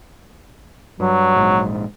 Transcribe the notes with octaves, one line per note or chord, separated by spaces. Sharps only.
G2 F#3
A#1 G#2